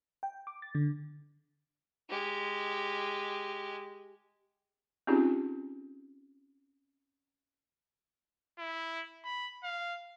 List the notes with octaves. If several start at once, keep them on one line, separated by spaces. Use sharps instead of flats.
G5
D6
A6
D3
G#3 G4
C4 C#4 D#4 F4 G4 G#4
E4
B5
F5